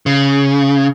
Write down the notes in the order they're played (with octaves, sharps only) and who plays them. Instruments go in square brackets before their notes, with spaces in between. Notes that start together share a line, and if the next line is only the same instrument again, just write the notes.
[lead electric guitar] C#3